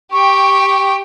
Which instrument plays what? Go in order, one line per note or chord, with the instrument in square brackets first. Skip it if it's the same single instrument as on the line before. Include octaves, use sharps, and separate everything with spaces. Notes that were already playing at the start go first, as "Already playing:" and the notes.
[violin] G4 G5 [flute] C#6